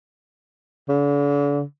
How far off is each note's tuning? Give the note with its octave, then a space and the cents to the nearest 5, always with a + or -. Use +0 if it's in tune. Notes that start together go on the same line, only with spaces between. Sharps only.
D3 -40